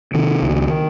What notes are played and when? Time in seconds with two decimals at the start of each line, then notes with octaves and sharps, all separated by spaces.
0.14 C3 D#3
0.42 C#2